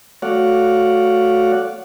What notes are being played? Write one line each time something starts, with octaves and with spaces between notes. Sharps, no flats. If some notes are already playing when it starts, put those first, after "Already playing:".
A3 F#4 C#5 D5 F5 F#5